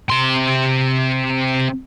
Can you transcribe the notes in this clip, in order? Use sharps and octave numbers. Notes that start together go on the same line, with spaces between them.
C3 C6